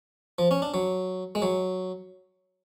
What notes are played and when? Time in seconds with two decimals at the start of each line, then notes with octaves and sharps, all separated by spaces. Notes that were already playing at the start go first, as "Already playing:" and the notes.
0.38 F3
0.51 C#4
0.62 D4
0.74 F#3
1.35 G#3
1.42 F#3